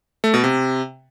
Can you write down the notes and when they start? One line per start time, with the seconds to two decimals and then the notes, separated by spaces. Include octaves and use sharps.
0.24 A3
0.34 B2
0.44 C3